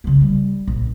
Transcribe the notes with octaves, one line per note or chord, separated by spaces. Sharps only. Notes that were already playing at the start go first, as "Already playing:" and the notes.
C#3 G#3
G3
A#1